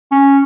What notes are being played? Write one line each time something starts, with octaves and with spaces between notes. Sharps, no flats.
C#4